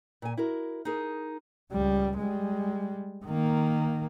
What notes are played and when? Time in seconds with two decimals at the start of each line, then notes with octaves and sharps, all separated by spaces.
0.22 A#2 G#5
0.38 E4 F#4 A#4
0.85 D#4 G#4 A#4
1.72 C#2 G3
2.18 G3 G#3
3.25 D#3 A#3